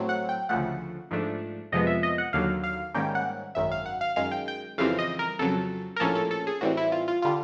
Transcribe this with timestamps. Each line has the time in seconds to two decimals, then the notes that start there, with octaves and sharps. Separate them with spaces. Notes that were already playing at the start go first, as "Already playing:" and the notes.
Already playing: A2 F#3 A3 C4
0.09 F#5
0.29 G5
0.49 D2 C#3 F3 A3 F#5
1.11 G#2 F3 A3 D4
1.72 F2 C3 F3 G#3 B3 D#5
1.87 E5
2.03 D#5
2.18 F#5
2.33 D#2 D3 F#3 F5
2.64 F5
2.94 G#2 D#3 G3 A#3 C#4 G5
3.15 F#5
3.55 G#1 F#2 D#3 E5
3.72 F5
3.86 F#5
4.01 F5
4.16 F#2 D#3 G#3 F5
4.32 G5
4.48 G5
4.78 F2 C#3 E3 G3 C4 F5
4.99 D#5
5.19 A#4
5.39 F2 C#3 F#3 A4
5.96 A#4
6.00 A#1 A2 F3 A#3 C#4 A4
6.15 A4
6.31 A4
6.47 G#4
6.61 A2 E3 G3 C4 F#4
6.77 E4
6.92 F4
7.08 F4
7.22 D3 G3 F4